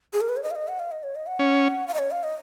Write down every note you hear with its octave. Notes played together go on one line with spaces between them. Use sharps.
G#4
A#4
B4
C#5
D#5
F5
D#5
F#5
F5
D#5
C#5
D#5
F#5
C#4
F5
D#5
C#5
F5
D#5